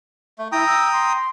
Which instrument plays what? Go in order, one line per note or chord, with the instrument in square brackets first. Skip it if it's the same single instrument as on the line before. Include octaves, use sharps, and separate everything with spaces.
[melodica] A3
[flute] E4 [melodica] G5 A#5 D#6
[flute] E6
C6